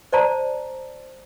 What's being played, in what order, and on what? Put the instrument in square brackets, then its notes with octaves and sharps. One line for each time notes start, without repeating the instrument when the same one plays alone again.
[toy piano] C5 D5 A5 A#5